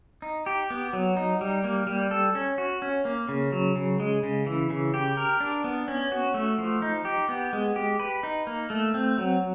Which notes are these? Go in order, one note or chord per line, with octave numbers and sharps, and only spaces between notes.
D#4
G4
B3
F#3
D#4
G3
A#3
G3
A4
C#4
F#4
C#4
A#3
C#3
F#3
C#3
G#3
C#3
E3
C#3
G4
A#4
D4
B3
C#4
F#4
A3
F3
D#4
G4
B3
G#3
G4
B4
D#4
A#3
A3
C4
F#3